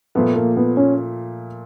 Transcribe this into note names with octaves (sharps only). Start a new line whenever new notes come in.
A#2 F3 A3 B3
A#3
B3
C#4